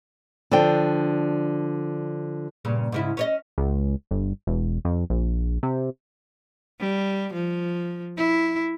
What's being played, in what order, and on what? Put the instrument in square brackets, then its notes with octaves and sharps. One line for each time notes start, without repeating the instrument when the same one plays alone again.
[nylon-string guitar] D3 F3 D4 G5
[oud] G2 A#2 C#3
G#2 C#3 E4
C#4 C#5 D#5
[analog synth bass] C#2
G1
E1
F2
A#1
C3
[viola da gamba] G3
F3
E4